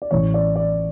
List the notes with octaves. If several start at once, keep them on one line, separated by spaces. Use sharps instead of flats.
D5
A1 A2 E3 C#5
D5
D5